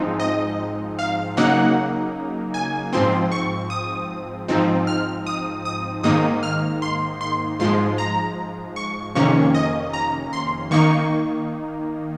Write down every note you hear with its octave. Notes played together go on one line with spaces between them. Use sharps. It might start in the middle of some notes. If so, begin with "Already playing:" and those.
Already playing: G#2 F3 G#3 C4 D#4
D#5
F5
C#3 F#3 A#3 D#4 F#5
G#5
G#2 F3 C4 C6
C#6
D#6
G#2 F3 C4 D#4
F6
D#6
D#6
G#2 D#3 A#3 D#4 D#6
F6
C6
C6
G#2 F3 G#3 C6
A#5
C#6
F2 C3 D#3 A#3 C#4 C#6
D#5
A#5
C6
D#3 A#3 D#4 C#6